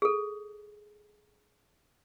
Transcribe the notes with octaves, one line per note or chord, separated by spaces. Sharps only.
G#4 A4